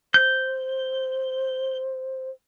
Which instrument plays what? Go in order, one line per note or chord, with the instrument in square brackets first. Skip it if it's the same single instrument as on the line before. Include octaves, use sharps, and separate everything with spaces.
[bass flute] C5 [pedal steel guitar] G6